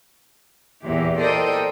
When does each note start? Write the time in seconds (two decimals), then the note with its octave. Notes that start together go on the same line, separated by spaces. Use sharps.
0.82 E2 A#2 E3 G4
1.18 A4 A#4 C5 D5 D#5 G5